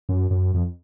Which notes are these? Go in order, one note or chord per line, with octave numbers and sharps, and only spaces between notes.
F#2
F#2
F2